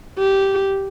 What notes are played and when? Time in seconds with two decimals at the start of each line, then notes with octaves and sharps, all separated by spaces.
0.19 G4